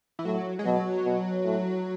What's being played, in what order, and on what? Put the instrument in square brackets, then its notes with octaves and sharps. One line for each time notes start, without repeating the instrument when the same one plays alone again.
[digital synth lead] E3
[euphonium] A2 [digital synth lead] F#3
[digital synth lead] G#3
[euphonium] B2 [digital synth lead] F#3
[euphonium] B2
A2